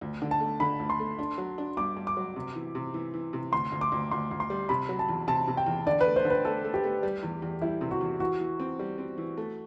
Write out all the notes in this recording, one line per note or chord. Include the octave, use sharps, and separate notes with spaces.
D2
D3
A5
A3
D3 B5
D2
C6
A3
D4
F#3
D4
G2 D6
G2
D6
F#3
C3
E3
C3
E3
E3
C3
D2 C6
D2
D6
D2
D2 C6
D2
C6
G3
C3 B5
F#3
A5
E2
C3 A5
C3
G5
E2
D3 D5
B4
A3
C5
D3
B4
A3 A4
A3
G4
A3
G3
E2
E2
G3 E4
C3
F#4
E2
E3 F#4
E3
C4
G3
C4
E3
A3